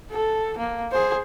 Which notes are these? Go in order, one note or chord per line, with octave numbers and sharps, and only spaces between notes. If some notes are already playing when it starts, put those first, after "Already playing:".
A4
A#3
G#4 C5